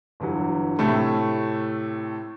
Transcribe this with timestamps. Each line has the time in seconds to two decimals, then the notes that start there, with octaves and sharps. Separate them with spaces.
0.20 G1 E3 F#3
0.79 A2 C3 A3